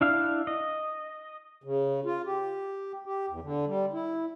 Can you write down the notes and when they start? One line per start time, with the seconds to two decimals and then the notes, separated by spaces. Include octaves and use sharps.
0.01 D4 E4 F5
0.47 D#5
1.64 C#3
2.05 F4
2.26 G4
3.06 G4
3.29 E2
3.42 D3
3.67 G3
3.93 E4